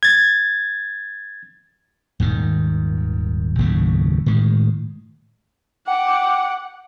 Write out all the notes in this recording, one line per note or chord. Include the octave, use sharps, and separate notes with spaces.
G#6 A6
D#1 G#2 D#3
F#1 D#2 A2 C#3
A2 D#3 G#3
F#5 G5 D6